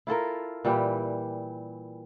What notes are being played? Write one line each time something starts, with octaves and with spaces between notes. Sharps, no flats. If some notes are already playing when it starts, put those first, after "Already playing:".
E4 F4 A4 A#4
A#2 E3 G3 G4